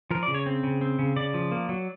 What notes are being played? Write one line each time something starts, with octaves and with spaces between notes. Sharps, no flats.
F3 A#4
D5
C#3
C#5
C4
C#3
C4
C#3
C#3 D5
F3
A#3
F#3